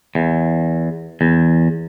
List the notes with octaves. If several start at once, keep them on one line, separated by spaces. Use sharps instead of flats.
E2
E2